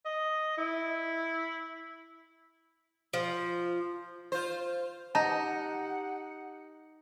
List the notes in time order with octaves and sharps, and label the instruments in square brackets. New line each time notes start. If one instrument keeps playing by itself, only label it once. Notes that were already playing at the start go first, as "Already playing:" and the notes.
[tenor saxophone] D#5
E4
[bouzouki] F3
[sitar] F4 C5
[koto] D#4 [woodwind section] G4 F#5 [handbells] A5 A#5